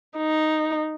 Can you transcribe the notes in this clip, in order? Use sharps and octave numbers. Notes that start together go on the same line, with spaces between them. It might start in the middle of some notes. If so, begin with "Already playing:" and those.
D#4